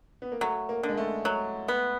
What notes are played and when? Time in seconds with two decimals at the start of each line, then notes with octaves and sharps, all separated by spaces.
0.22 B3
0.32 A#3
0.41 F#3 A3
0.69 A#3
0.83 D3
0.89 G#3
0.97 A3
1.25 F#3
1.68 B3